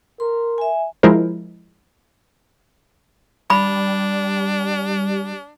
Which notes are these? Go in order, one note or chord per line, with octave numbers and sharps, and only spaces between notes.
A#4 C6
E5 G#5
F3 G#3 E4 A#4 C5
G3 D4 B5